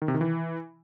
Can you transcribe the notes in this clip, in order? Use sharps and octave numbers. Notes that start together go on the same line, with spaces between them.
D#3
C3
D#3
E3